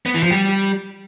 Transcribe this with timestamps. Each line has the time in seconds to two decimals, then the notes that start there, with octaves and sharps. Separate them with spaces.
0.06 B3
0.14 E3
0.23 F3
0.31 G3